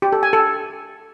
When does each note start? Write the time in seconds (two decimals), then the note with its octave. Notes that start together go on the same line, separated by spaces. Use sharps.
0.02 G4
0.13 A4
0.23 G#5
0.33 A4